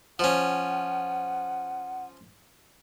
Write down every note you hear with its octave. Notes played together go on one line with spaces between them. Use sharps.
F3 C#4 F#5